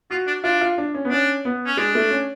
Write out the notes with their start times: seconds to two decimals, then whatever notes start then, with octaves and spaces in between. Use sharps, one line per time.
0.11 F4 F#4
0.27 D4
0.44 D4 F4
0.61 F4
0.78 D4
0.94 C#4
1.05 B3
1.10 C#4 D4
1.45 B3
1.66 C#4
1.77 G#3 D4
1.95 A3
2.11 C#4